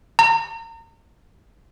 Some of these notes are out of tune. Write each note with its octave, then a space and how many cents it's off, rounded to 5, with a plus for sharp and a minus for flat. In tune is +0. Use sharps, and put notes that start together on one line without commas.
A#5 -35